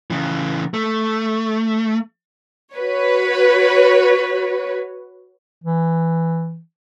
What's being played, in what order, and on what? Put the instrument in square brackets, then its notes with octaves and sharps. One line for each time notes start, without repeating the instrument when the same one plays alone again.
[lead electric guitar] C#3 E3
A3
[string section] F#4 B4 C#5
[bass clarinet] E3